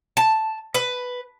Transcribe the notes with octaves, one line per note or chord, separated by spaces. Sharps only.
A5
B4